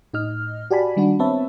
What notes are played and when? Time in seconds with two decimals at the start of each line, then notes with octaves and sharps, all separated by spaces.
0.13 A2 D#4 D#5 F6
0.71 F#4 G4 D5 G#5 A5 B5
0.96 D#3 G3 D4 F#4
1.19 B3 C4 B4 C#5 E5 A5